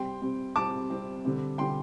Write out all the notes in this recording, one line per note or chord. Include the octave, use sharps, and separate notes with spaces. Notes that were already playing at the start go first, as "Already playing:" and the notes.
Already playing: C3 G3 C4 G5 C6
C3 G3 C4
C3 G3 C4 A5 D6
C3 G3 C4
D3 G3 C4
D3 G3 C4 G5 C6